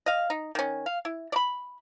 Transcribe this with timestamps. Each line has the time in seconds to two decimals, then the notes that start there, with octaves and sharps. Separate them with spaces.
0.06 D#5 F5
0.30 D#4
0.55 D#3 C#4
0.86 F5
1.05 E4
1.32 D5 B5